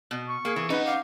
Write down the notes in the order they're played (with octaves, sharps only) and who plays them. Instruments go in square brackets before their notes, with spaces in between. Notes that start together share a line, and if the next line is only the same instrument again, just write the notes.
[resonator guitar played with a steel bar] B2
[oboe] C#6
[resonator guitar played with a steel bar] A#3 [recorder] G#4
[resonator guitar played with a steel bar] E3
[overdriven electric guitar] C#4 F#5 [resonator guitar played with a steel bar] D#4 [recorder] B4
[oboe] G4 [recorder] F5